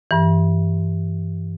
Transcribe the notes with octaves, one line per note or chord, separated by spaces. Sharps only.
G2 E3